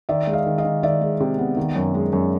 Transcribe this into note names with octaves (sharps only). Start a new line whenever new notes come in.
D#3 D5 E5
G#3
D#5 F5
D#3
D#5 F5
D#3
D#3 D5 E5
G#3
C3
B3
D#3
F#2
G#3
F#2